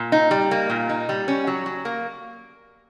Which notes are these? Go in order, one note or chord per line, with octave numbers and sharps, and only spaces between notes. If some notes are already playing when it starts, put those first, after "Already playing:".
Already playing: A#2
D#4
G3
A#3
A#2
D#4
G3
C#4
F#3
F#3
A#3